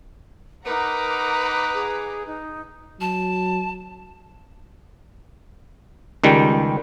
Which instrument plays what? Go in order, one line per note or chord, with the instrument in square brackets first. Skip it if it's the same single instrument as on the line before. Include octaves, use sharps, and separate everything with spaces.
[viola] D#4 [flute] A#4 [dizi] B4 [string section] F#5 A#5 D6
[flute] G#4
D#4
[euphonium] F#3 [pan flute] A5
[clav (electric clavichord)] C#2 D#3 G3